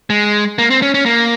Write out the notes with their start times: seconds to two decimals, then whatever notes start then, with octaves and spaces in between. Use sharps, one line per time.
0.10 G#3
0.58 A#3
0.70 C4
0.82 C#4
0.94 C#4
1.06 A#3